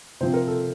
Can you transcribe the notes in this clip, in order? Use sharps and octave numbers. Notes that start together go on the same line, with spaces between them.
C3 F3 C4 C5
A#4
A4